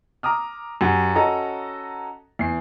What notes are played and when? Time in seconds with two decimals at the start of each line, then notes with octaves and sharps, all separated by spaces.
0.23 A#5 D6 D#6 F6
0.81 F#2 G4 F#5
1.15 C#4 F#4 A4 D#5 A#5
2.39 E2 C7